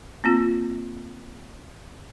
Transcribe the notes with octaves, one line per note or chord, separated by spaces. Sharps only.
A#3 C4 F4